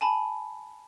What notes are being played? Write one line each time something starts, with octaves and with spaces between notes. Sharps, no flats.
G#5 A5 B5